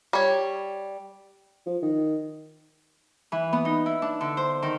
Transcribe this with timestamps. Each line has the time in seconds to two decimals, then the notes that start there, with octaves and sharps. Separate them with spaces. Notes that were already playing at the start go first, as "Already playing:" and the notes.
0.13 G3 C#5
1.66 F3
1.82 D#3
3.32 E3
3.53 B3
3.65 D#4
3.86 E4
4.02 D4
4.21 D3
4.37 C5
4.62 D#3